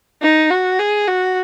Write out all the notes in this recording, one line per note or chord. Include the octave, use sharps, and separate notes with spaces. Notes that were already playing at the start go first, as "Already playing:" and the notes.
D#4
F#4
G#4
F#4